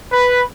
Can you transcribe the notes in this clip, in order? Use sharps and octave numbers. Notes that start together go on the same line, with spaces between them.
B4